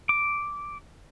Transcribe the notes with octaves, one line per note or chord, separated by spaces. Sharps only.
D6